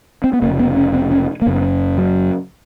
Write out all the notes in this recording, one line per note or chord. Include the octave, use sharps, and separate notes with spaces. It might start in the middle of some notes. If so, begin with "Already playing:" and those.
C4
B3
F1 D#2 C#3 A#3
B3
C#4
C4
C#4
A#3
F#1 F#2 C#3 B3
F#3